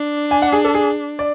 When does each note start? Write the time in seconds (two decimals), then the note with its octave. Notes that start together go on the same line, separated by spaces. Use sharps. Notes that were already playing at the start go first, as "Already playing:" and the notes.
Already playing: D4
0.31 G#5
0.42 F#5
0.52 G#4
0.64 A4
0.74 G#4
1.19 D5